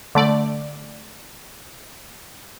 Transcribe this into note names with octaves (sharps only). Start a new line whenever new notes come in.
D3 A3 D5